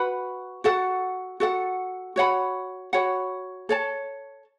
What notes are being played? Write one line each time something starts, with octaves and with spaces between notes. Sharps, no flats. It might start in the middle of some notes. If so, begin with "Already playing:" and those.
Already playing: F#4 B4 F#5 B5
F#4 A4 F#5
F#4 A4 F#5
F#4 C#5 F#5 B5
F#4 C#5 F#5 B5
A4 C#5 A5